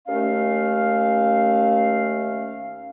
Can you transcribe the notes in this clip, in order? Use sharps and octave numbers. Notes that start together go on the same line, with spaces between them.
D#2 A3 C#4 F5